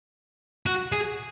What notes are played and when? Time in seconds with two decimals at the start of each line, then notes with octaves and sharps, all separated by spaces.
0.66 F#4
0.92 G#4